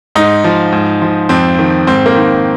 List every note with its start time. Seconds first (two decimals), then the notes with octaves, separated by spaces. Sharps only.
0.15 G#2 D#4
0.44 F3
0.72 G#2
1.02 F3
1.29 F2 C4
1.59 D#3
1.87 G#2 C4
2.06 A#3
2.15 D#3